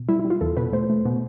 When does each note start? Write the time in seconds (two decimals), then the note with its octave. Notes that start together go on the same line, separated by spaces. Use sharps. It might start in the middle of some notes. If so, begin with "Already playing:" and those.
Already playing: B2
0.09 G3 E4
0.19 E4
0.25 G3
0.30 F4
0.41 E2 A4
0.57 B2 B4
0.73 A3 C5
0.90 A3
1.05 B2